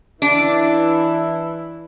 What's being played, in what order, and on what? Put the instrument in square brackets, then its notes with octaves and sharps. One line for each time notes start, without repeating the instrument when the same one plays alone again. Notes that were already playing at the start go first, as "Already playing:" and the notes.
[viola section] E3 E4 [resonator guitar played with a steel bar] D4